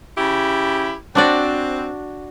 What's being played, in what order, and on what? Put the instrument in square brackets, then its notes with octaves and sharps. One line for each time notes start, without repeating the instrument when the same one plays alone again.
[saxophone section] C#3 E4 G4
[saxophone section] C4 [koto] D4 F#4 D5